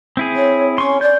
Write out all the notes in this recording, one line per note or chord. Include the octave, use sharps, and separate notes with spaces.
C4 E4 G#4
C#5
C#4 C6 C#6
D5 G6